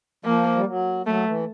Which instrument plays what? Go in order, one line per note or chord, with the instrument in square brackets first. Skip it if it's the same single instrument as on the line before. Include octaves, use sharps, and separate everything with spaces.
[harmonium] F3 [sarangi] A#3
[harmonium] G3
F#3
[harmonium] F#3 [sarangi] A3
[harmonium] E3